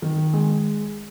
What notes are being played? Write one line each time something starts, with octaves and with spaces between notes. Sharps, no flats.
D#3
G#3